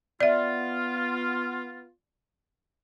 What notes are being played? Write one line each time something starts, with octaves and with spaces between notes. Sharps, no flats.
B3 F4 D5 E5